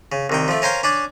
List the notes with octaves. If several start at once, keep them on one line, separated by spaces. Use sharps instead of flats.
C#3
C2 D#3 G5
F3 A3
C#4 A#4 C5 F5 G5
C#4 D4 D5